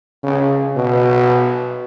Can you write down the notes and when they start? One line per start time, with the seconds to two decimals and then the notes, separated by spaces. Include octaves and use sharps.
0.24 C#3
0.76 B2